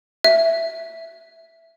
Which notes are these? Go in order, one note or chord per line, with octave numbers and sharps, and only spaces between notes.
E5